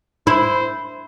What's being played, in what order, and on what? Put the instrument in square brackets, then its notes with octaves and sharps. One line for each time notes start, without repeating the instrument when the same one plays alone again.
[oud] E4 [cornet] C5